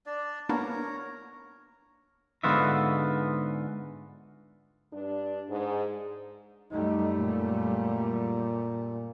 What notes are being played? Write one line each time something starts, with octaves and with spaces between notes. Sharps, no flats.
D4 D5
A#3 B3 D4 A#4 C#5 A#5
G#2 D3 B3 F4 F#4 E5
G2 D4
G#2
F#2 G3 A3 D#4
A#2